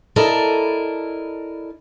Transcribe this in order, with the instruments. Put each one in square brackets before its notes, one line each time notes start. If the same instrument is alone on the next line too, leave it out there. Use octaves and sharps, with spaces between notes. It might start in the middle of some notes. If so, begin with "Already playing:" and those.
[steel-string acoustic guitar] E4 A4 A#4 D5 D#5